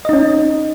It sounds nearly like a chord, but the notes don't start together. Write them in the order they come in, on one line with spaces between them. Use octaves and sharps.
D#5 D#4 C#4